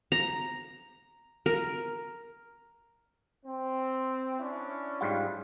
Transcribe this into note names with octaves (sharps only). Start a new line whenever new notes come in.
A#5
A#4
C4
C#4 D4 E4
G#2 G3 F4